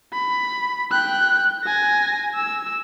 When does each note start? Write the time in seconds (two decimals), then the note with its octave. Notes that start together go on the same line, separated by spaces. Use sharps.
0.13 B5
0.92 G5 F#6
1.65 G#5 A#6
2.35 E6